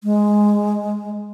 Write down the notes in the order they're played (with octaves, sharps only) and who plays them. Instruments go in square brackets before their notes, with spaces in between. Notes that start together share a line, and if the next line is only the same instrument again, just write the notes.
[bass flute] G#3